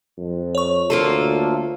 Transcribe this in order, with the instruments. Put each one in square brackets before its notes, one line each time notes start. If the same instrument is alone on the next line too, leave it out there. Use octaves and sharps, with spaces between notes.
[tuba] F2
[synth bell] C#5 C#6
[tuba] D2 [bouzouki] A#3 F4 A4